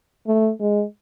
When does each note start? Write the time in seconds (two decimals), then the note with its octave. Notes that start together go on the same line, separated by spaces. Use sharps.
0.27 A3
0.60 G#3